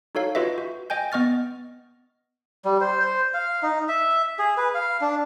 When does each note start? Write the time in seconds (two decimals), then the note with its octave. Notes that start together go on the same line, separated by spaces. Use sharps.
0.15 D#4 F#4 A4 C#5 F5
0.35 F4 F#4 B4 D#5 E5
0.58 F#4
0.90 D#5 G5 G#5 G6
1.12 B3 D#5 C#6 F6 A6
2.65 G3
2.81 C5
3.00 C5
3.34 F5
3.63 D#4
3.88 E5
4.39 G#4
4.57 B4
4.74 F5
5.01 D4